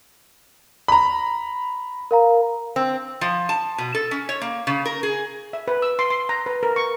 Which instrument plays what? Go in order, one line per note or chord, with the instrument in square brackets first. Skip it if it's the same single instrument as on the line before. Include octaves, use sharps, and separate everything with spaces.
[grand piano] A#5 B5
[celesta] A#4 F5 A#5
[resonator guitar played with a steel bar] C4
F3
A5
B2
A4
C#4
C#5
A#3
C#3
A#4
G#4
[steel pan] E5
B4
E6
C6
C6
A#5
B4
A#4
C#6